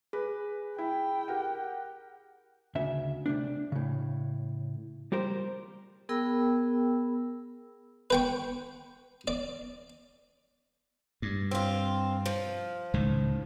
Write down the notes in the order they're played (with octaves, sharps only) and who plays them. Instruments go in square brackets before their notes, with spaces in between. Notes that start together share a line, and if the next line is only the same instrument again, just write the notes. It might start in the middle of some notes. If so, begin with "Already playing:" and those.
[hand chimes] G#4 [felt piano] B4
[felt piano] E4 [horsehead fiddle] G5
[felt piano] G4 A#4 F#5
[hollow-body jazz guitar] D2 C#3 E5
C3 A3 D4
A2 C#3
G3 G4 A#4 C5
[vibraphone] B3 G#4 A#4 G5 B5 E6
[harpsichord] B4 G5 C#6
D5
[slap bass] G2
[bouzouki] C4 F4
F3
[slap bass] C#2 A2 D#3